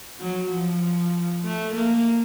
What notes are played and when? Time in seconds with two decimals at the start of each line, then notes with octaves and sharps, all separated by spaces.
0.20 F#3
0.51 F3
1.43 A3
1.74 A#3